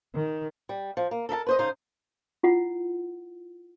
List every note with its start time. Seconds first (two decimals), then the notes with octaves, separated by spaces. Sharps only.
0.14 D#3
0.69 G3
0.97 F3
1.11 A#3
1.29 A4 A#4 E5 A5
1.46 B4 C5 D#5
1.58 G#2 C#3 D#4 C5
2.43 E4 F4 F#5